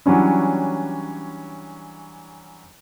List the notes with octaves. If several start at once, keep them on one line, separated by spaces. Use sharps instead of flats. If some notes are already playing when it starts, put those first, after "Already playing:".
E3 F#3 G3 C#4 D4